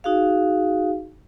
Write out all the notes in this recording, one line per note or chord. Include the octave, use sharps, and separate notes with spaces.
D#4 F#4 G#4 F5